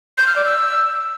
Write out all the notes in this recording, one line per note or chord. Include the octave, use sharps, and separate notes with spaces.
G6
F6
D5
E6